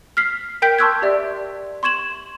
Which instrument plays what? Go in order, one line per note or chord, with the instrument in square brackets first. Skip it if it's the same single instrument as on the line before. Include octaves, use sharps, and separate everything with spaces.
[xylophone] F6 B6 C7
A#4 G5 G6 B6 D7
A5 C6 C#6 E6 F#6 G#6
G4 D5 E5
C6 C#6 G#6 E7 F#7